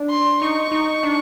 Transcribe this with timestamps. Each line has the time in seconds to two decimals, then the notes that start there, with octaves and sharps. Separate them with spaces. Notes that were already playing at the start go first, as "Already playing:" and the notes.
Already playing: D4
0.10 C6
0.42 D#4 C#6
0.72 D#4
1.03 D4